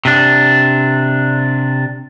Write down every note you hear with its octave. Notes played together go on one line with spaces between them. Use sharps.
C3 D4